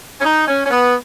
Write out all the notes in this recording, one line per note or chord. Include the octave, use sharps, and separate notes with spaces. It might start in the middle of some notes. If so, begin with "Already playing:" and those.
C#4
D#4
C#4
C#4
B3